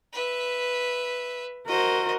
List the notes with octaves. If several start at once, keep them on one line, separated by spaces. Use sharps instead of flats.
B4 E5
F#4 A#4 C5 D#5